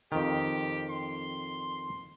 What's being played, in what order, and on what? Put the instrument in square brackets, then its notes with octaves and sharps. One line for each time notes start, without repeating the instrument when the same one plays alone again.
[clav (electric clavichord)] F2 D#3 [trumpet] G4
[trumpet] C6